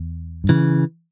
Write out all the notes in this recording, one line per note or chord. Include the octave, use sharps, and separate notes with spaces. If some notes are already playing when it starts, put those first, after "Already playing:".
Already playing: E2
G2
C#3 E3